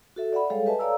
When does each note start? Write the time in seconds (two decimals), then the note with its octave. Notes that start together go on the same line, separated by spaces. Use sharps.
0.16 F#4 A4 E5
0.33 D5 E5 F#5 B5
0.50 G3 G#3 G#4 A4 C#5 F5
0.66 G4 B4 D#5 E5 G#5 A5
0.79 A4 C#5 D5 F5 A#5 E6